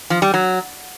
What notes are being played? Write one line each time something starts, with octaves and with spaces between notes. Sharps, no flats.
F3
G3
F#3